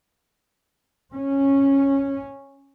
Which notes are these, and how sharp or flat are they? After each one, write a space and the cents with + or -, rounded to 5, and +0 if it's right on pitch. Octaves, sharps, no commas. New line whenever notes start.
C#4 -10